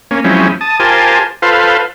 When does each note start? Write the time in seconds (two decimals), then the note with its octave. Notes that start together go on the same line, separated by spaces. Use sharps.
0.11 A#3 C#4
0.24 F3 F#3 G#3 C4 C#4 E4
0.61 A5 D#6
0.80 F4 G4 A#4 C5 G#5 A5
1.42 F4 A4 B4 C5 F5